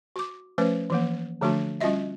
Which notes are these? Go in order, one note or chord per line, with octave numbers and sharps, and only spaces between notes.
F#4 D6
F3 A3 C#4 B4 C5
E3 F3 A#3
D3 F3 A3 D4 F#4
G3 C#4 F4 F#4 D#5 E5